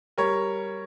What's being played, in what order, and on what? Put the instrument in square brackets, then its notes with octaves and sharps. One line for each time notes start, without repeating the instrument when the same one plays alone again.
[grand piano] G3 A#4 C#5